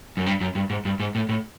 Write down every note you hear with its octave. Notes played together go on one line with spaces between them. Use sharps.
F#2
G2
F#2
G2
G#2
G2
G#2
A2
A2